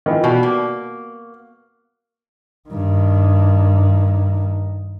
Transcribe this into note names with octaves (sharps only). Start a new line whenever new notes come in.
D#3 E3 F4
B2 G3 F#4
A#3
G2 D#3